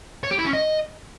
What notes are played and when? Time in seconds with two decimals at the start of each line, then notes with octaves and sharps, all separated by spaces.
0.23 C#5
0.31 G4
0.38 E4
0.46 C#4
0.53 D#5